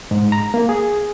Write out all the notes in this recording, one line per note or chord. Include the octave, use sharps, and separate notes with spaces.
G#2
A#5
A#3
G#4